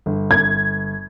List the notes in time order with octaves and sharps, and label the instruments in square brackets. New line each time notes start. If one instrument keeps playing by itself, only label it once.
[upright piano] G1
[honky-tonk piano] G#6